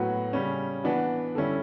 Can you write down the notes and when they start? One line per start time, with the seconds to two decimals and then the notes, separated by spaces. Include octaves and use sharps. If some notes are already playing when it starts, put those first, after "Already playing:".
Already playing: A2 F#3 B3 F#4
0.33 C#3 G3 C#4
0.84 E3 B3 D4 F#4
1.35 D3 G3 C#4 E4